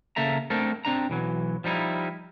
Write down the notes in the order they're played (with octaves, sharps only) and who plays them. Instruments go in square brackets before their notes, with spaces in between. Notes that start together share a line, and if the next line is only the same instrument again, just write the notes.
[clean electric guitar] C#3 A#3 A4 E5 A#5
A3 C4 D4 A4 A#4
C4 D4 A#5
B1 E3 F#3
F3 G3 D#4 E4